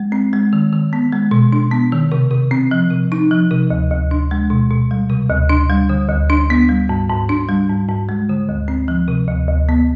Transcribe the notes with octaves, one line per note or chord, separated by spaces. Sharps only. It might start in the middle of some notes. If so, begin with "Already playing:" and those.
Already playing: G#3
C4
G#3
D#3
D#3
B3
G#3
B2
D4
B3
D#3
C3
C3
C4
F3
C3
D#4
F3
C3
D2
D2
D4
G#3
B2
B2
G3
C3
D2
D4
G3
D3
D2
D4
B3
G3
G#2
G#2
D4
G3
G#2
G#2
G#3
D3
D2
C4
F3
C3
D2
D2
B3